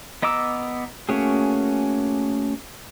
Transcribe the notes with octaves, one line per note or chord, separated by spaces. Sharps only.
B3 D#5 A#5 D6 E6
A3 A#3 C#4 F#4 G#4